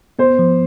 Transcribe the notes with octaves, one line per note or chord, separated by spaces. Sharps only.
B3 C5
F3